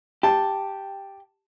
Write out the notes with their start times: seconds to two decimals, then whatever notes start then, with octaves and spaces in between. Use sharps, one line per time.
0.23 G4 A5